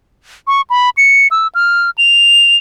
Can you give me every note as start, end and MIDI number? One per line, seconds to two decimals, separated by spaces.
0.47 0.61 85
0.70 0.90 83
0.97 1.27 97
1.31 1.48 88
1.55 1.90 89
1.98 2.56 101